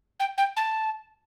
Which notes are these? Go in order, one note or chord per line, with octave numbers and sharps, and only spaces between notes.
G5
G5
A5